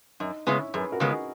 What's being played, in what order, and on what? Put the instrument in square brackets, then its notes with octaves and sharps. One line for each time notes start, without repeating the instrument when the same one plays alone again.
[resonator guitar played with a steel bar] F#2 [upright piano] D#4
[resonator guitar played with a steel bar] C#3 G#3 B3 [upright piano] C#4 E4
[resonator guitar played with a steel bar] F#2 [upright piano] G#4 B4
[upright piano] F#4 A#4
[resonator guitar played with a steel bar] C#3 G#3 B3 [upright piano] G#4
[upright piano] D#4 F#4